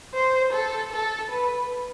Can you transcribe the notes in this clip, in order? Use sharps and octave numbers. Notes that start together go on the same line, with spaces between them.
C5
A4
A4
B4